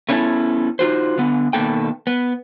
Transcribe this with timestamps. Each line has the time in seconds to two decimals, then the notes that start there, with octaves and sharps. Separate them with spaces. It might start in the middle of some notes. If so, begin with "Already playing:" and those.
0.09 A3 B3 C#4 D4 E4 A4
0.79 D#4 F4 F#4 C5
1.17 D3 B3
1.53 B2 D#3 A#3 B3 A4 G5
2.07 B3